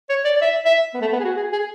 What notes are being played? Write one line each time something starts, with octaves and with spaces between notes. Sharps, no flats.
C#5
D5
D5
E5
E5
B3
A3
B3
G#4
F#4
G#4
G#4